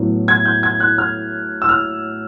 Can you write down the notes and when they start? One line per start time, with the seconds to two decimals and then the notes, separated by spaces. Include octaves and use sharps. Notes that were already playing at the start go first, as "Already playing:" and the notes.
Already playing: A2 F#3 B3 E4
0.28 G#6
0.45 G6
0.63 G#6
0.80 F#6
0.98 F6
1.62 E6
1.69 F6